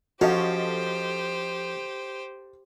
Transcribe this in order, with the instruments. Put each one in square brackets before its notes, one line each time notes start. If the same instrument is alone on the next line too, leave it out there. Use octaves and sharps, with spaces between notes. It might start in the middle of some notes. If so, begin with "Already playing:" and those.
[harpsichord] F3 C#4 [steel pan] F#4 [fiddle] G4 C5 [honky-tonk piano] A4 D#5